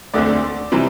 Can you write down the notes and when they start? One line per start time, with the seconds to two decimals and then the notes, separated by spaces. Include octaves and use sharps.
0.14 D2 D3 A3 C4 D5
0.72 C3 E3 G3 C4